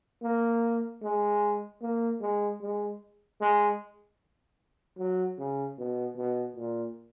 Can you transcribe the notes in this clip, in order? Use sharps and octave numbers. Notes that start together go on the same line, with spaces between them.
A#3
G#3
A#3
G#3
G#3
G#3
F#3
C#3
B2
B2
A#2